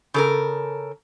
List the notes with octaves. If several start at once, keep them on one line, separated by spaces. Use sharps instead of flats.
C#3 A4 A#4